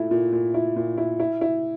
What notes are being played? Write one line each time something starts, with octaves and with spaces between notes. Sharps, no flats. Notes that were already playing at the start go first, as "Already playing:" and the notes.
Already playing: A#2 A3 E4
A#2
A#2
E4
A#2
E4
E4
E4